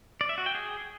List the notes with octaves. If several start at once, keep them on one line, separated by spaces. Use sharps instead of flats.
D5
E5
F#4
G5
G#4